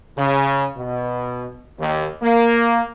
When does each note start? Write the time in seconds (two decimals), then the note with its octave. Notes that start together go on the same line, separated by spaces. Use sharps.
0.17 C#3
0.76 B2
1.80 D#2
2.22 A#3